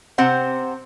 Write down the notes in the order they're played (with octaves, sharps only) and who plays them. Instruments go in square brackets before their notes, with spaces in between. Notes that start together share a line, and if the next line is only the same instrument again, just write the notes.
[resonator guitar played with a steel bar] C3 C4 C5 F#5